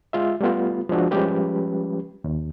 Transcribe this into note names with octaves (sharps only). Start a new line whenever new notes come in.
G#3 F4 E5
G3 A3 B3 F4
F3 G#3 D4 F#4
F3 G3 G#3 C#4 G4 B4
D#2